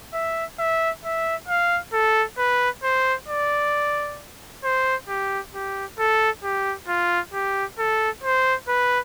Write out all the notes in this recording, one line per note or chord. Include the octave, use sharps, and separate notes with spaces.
E5
E5
E5
F5
A4
B4
C5
D5
C5
G4
G4
A4
G4
F4
G4
A4
C5
B4